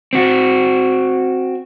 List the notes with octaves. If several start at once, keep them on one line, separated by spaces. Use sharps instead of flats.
C4 F#4